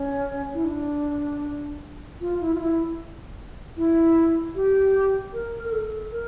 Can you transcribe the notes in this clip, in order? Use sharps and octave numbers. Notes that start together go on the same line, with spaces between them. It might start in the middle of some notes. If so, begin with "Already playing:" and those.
Already playing: C#4
E4
D4
F4
E4
F4
E4
E4
G4
A#4
A#4
A4
A#4